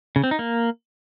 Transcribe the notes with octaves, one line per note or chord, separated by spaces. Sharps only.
C#3
C4
D#4
A#3